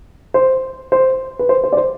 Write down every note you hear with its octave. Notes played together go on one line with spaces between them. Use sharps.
C5
C5
B4
C5
C5
D5
C5